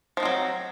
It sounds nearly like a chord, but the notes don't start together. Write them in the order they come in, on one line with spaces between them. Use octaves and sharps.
F3 D#4 C4 F#3